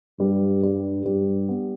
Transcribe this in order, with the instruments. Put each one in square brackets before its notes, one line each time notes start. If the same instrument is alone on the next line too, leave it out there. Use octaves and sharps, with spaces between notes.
[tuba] G2 [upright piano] G3
[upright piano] G3
[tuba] G2 [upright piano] G3
[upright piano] B3